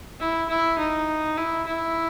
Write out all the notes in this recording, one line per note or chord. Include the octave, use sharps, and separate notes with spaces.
E4
E4
D#4
E4
E4